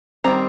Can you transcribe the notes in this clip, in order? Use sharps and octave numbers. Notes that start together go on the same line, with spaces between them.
D#3 G3 C4 A#5